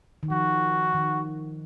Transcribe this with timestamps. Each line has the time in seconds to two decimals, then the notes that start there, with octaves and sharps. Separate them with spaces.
0.23 D#3
0.30 F3 F#4
0.95 D#3